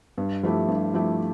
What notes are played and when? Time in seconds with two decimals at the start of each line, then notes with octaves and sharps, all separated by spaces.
0.18 G2
0.43 F3 A3 E4 G4
0.68 G2
0.94 F3 A3 E4 G4